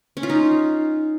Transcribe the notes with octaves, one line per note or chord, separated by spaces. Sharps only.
C#4
F4
D#4